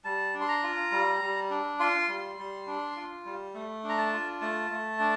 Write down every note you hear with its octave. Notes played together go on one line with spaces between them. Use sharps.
G3 A5
D4
C6
A#5
F4
G3
G3
D4
F4 C6
G3
G3
D4
F4
G3
A3
D4
A#5
A5
F4
A3 A5
A3
D4